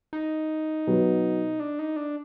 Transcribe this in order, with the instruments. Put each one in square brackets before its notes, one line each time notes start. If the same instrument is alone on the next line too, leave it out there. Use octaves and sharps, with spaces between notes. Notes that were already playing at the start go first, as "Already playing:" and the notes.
[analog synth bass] D#4
[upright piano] B2 F#3 B3
[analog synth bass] D4
D#4
D4